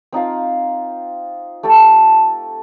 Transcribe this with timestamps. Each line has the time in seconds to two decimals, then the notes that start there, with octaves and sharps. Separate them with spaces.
0.13 C4 D#4 F4 F5
1.63 A3 G4 A4 A5